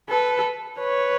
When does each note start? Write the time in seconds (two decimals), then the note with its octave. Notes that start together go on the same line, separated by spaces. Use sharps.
0.09 A4 B4
0.79 B4 C#5